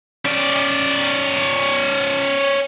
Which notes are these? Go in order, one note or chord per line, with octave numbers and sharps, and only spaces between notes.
C#4 D5